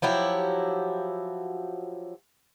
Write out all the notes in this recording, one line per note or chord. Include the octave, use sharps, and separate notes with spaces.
F3 F#3 E4 G4